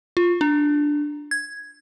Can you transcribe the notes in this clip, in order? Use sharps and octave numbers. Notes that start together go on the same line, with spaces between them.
F4
D4
G#6